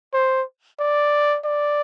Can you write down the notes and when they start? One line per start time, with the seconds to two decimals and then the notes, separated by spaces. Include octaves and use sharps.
0.14 C5
0.79 D5
1.45 D5